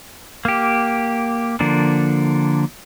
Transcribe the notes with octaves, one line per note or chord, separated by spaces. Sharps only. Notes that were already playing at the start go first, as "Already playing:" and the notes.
A#3 G4
D3 F3 A#3 D4